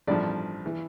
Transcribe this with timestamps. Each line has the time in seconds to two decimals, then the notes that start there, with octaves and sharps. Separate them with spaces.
0.07 A1 G2 F3 D5
0.66 E3